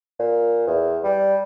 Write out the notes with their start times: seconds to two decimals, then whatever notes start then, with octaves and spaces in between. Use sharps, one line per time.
0.19 A#2
0.67 E2
1.04 G3